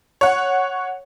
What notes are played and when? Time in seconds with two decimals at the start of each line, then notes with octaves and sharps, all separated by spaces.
0.21 C#5 F#5